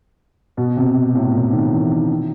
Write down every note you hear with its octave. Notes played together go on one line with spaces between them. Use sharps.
B2
C3
B2
A2
A#2
D#3
E3
D#3
D#3